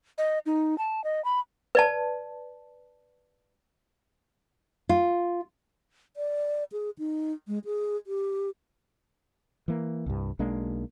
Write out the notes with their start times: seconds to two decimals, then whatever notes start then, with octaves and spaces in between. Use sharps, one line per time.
0.18 D#5
0.46 D#4
0.78 A5
1.04 D#5
1.25 B5
1.75 B4 D5 A5
4.89 F4
6.17 D5
6.72 G#4
6.99 D#4
7.48 G#3
7.65 G#4
8.07 G4
9.68 E3 A#3
10.06 C2 G2
10.39 B1 G#3 A#3 D4